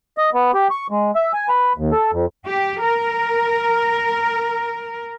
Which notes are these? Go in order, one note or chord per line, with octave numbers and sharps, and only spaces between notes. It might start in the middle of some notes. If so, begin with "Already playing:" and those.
D#5
B3
G4
C#6
G#3
E5
G#5
B4
D#2
A4
F2
G4
A#4